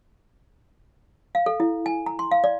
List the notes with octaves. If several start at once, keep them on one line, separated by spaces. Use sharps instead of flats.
F5
A4
E4
G#5
A#5
C6
F5
D5